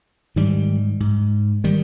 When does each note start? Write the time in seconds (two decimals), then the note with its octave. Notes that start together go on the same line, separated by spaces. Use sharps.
0.36 G#2 D#3 G3
1.00 G#2
1.64 D#3 G3